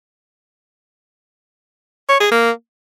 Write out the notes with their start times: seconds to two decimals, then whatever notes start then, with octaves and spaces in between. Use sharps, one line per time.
2.09 C#5
2.20 G#4
2.32 A#3